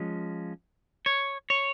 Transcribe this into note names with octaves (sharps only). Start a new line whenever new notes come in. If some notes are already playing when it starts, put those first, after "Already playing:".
Already playing: F3 G#3 C#4
C#5
C#5